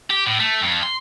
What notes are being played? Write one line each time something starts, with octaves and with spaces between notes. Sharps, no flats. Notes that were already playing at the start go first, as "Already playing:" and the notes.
G4
A2
A3
F2
C6